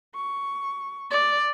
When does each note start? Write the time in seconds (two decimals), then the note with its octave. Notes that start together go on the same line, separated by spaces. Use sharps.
0.15 C#6
1.11 D5